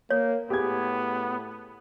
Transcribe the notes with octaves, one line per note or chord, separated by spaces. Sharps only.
A#3 C#5
A2 B3 G4 G#4 G#6